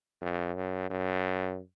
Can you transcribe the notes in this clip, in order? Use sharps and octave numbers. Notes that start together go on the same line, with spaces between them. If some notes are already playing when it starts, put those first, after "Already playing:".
F2
F#2
F#2